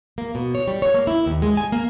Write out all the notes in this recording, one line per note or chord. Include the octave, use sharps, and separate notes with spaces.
A#3
B2
C#5
G3
C#5
A#3
E4
D#2
G#3
G#5
A#3